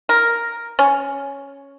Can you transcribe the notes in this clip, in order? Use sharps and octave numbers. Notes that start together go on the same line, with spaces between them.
A#4
C#4